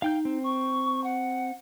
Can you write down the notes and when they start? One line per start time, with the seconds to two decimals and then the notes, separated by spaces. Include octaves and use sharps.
0.02 D#4 F5 G5 G6
0.25 C4
0.44 C#6
1.04 F#5